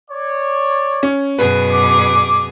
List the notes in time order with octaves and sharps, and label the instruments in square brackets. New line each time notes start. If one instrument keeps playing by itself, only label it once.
[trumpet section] C#5 D5
[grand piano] C#4
[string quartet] F#2 B2 G#4 [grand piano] B4
[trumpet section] D6